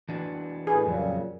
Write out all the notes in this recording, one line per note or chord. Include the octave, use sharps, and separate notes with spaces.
E3 D4 F#4
A2 G#4 B4
F2 A#2 C#3 F#3 G3